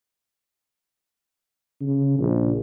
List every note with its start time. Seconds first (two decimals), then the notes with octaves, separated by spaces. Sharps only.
1.81 C#3
2.19 A#1